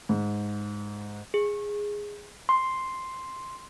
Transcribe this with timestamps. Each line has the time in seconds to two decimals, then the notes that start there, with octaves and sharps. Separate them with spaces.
0.09 G#2
1.34 G#4
2.49 C6